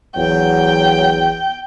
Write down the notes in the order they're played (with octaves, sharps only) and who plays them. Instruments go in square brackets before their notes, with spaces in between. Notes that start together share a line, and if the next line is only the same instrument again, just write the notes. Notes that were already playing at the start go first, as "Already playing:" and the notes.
[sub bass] G#1 [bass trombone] E2 [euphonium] F#3 [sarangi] G5